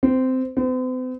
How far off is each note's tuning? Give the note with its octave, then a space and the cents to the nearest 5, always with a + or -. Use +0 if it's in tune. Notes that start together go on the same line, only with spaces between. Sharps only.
C4 -15
C4 -45